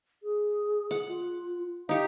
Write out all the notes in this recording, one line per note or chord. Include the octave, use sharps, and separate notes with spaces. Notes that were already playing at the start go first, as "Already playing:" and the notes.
G#4
F#5
F4
D#4 G4 F5